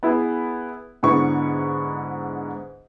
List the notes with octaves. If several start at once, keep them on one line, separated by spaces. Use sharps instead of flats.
B3 E4 G#4
G#2 D3 B3 E4 C#6 C#7